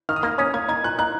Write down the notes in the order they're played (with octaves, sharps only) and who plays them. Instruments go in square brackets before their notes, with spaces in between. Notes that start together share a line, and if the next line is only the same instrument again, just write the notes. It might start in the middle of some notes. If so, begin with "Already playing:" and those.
[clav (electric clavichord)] D#3 [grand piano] F6
[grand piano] D#6
[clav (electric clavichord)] A#3 [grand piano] F6
[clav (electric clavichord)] C#4 [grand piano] D#6
[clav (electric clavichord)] A#3 [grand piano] G#6
[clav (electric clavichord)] D#4 [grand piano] G#6
[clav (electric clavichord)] A#2 [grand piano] F#6
[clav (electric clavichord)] D#4 [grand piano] F#6